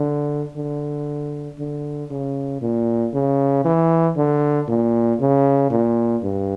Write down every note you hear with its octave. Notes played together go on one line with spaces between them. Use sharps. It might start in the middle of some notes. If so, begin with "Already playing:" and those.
Already playing: D3
D3
D3
C#3
A#2
C#3
E3
D3
A#2
C#3
A#2
G2